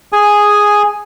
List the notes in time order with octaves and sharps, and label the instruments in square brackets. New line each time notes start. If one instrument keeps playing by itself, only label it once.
[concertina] G#4 G#5